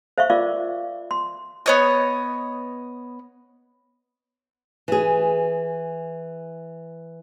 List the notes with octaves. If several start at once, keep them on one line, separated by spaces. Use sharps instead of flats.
C5 E5 F5 C#6
F4 A#4 D5 F5 C#6 D6
C6
B3 C#5 D#5
E3 G#4